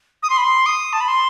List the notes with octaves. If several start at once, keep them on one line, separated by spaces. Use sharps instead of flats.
D#6
C6
B5
C6
D#6
A5
B5
C6